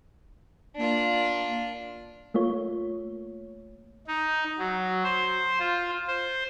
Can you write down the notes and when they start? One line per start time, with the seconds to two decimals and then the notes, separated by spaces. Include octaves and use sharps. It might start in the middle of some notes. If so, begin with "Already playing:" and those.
0.77 A#3 D4 F4
2.34 A3 A#3 F4 C#5
4.07 D#4
4.58 F#3
5.03 C5
5.59 F4
6.07 C5